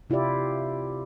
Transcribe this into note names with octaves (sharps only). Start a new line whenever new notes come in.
C3 E4 F4 G4 D5